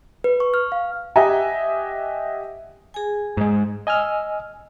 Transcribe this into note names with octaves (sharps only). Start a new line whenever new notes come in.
B4
C#6
F6
F5
G4 D#5 E5 F#5 G#5
G#4 G#5
G#2 G#3
D#5 G#5 E6 F6